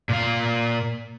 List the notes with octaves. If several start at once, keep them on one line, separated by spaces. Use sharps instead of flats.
A#2 F5